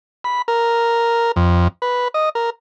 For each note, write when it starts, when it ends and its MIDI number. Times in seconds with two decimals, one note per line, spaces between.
0.24 0.42 83
0.48 1.32 70
1.36 1.68 41
1.82 2.08 71
2.14 2.29 75
2.35 2.50 70